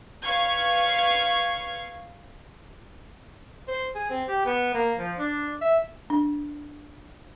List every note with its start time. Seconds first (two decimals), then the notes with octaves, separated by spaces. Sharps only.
0.24 B4 F5 C#6 G#6
3.68 C5
3.95 G#4
4.10 C4
4.28 G4
4.46 B3
4.74 A#3
4.98 F3
5.18 D4
5.61 E5
6.10 D4